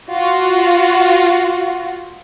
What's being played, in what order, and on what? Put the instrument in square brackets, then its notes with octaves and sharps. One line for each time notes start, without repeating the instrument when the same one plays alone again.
[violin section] F4 F#4